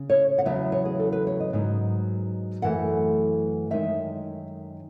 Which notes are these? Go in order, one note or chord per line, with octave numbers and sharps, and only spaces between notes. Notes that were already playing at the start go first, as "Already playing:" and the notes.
Already playing: C#3
C#5
F#5
E2 C#3 F#3 B3 E5
C#5
G#4
A4
B4
C#5
D#5
G#2 F#3 B3 D#4
F#2 E3 A3 F#5
F#2 D#3 G#3 D#4 E5